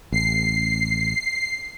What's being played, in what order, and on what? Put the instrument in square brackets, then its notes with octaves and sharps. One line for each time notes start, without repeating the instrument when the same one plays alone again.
[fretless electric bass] A1 [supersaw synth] C7